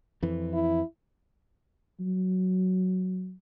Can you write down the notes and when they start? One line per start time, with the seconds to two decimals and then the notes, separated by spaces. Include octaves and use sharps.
0.22 F2 E3
0.53 E4
2.00 F#3